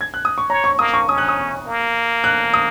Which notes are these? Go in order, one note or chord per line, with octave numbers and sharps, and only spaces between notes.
G#6
F#6
D#6
C#6
C#5 A#5
C#6
A#3 D#6
C#6
C#4 D#6
F#6
D#6
A#3
F#6
D#6